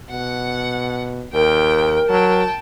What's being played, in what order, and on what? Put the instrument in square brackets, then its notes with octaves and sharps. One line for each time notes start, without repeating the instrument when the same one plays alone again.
[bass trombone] B2 [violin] F#5
[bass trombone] D#2 [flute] A#4 [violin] G5
[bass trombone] F#3 [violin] G5 A5